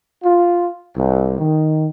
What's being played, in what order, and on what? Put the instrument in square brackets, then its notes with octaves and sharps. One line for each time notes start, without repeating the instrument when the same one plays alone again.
[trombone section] F4
C2
D#3